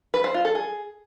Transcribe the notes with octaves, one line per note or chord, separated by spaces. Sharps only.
B4
C5
F4
A4
G#4